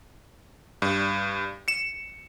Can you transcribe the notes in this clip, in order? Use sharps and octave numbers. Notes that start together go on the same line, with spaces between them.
G2
C#7 E7